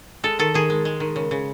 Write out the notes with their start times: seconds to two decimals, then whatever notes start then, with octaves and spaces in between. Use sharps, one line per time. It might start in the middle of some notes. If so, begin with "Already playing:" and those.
0.24 G#3 A4
0.39 D#3 A4
0.54 D#3 G#4
0.70 G#3
0.85 G#3
1.00 D#3
1.16 C#3
1.31 C#3